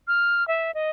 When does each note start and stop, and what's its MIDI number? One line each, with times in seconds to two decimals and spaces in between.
0.08 0.46 89
0.48 0.71 76
0.75 0.91 75